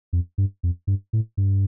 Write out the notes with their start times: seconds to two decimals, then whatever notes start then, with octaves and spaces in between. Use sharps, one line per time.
0.13 F2
0.38 G2
0.63 F2
0.87 G2
1.13 A2
1.37 G2